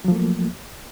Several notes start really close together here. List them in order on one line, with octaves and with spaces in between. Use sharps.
F#3 F3 A3 A#3